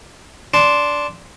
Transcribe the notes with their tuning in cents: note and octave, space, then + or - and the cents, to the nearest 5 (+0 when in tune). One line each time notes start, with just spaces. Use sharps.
D4 -10 C6 +0